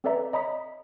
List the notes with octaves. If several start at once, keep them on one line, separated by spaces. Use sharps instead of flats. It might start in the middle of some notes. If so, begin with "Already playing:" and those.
C4 A4 B4 D5 E5 A#5
C#5 D#5 A#5 B5 D#6 B6